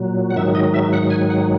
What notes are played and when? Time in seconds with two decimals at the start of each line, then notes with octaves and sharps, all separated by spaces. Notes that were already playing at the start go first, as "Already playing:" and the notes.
Already playing: A#2 F#3
0.31 F#5
0.36 G#2 D#3 F#3 E5
0.55 D#5
0.74 E5
0.93 F#5
1.10 G#5
1.30 F#5